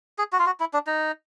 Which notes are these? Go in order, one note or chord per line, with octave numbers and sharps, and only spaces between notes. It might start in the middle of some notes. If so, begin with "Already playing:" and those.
G#4
F#4
F4
F#4
E4
D4
D#4